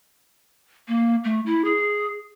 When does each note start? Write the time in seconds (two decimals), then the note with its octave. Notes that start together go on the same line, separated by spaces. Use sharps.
0.88 A#3
1.24 A3
1.46 E4
1.65 G#4